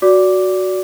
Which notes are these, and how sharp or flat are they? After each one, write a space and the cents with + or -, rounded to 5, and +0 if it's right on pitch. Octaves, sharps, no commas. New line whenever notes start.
F#4 +0 D5 -20 D6 +0